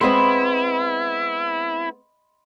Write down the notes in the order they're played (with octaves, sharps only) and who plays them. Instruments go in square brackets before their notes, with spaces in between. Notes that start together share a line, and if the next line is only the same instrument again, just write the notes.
[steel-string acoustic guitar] G#3 B3 C4 [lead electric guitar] E4 [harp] D#5 B5 C6